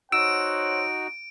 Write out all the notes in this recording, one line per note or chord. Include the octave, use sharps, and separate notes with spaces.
D#4 F#4 C5 C#5 F#5 E6 D7